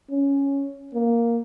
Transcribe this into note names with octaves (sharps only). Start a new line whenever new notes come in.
C#4
A#3